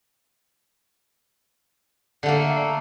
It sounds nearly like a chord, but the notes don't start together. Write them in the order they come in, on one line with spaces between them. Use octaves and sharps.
D3 A3 A#3